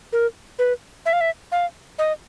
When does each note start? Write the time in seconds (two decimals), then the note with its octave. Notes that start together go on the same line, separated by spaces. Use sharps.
0.13 A#4
0.59 B4
1.06 E5
1.13 F5
1.21 E5
1.52 F5
1.99 D#5